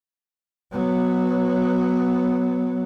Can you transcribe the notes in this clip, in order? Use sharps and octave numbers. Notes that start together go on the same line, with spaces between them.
F#3 B3